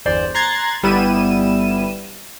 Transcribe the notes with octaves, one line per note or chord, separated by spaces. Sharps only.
G1 E2 C5 D5
A#5 C6 F#6 G#6 A6
G1 G3 B3 E4 D#7 E7